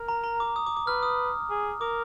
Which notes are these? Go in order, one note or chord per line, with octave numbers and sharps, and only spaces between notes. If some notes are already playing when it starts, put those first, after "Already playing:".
Already playing: A#4
A#5
A#5
D6
D#6
D6
D6
B4 F6
D#6
G#4
A#4 D6